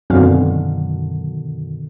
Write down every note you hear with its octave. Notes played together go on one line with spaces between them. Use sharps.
F#2 B2 D3 D#3 C4 C#4 F5